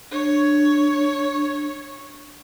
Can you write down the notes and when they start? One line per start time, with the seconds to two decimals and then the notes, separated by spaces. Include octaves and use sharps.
0.12 D4 C#5